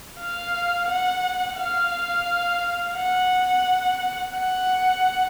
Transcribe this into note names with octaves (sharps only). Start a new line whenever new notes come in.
F5
F#5
F5
F#5
F#5